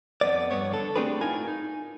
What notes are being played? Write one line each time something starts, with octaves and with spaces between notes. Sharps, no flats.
F2 B3 D5
G2 B3 C#5
D3 A4
A3 C4 D4 G4 G#4 B4
A2 D#4 F4 A#4 G#5
D#4